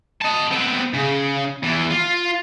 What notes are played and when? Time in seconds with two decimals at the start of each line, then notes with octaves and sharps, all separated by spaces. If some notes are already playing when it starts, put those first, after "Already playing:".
0.21 D#5 A5
0.51 B3 C4
0.93 C#3
1.63 E2 E3
1.91 F4